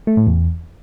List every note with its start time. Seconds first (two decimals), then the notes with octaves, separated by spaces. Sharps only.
0.07 A3
0.17 A2
0.27 E2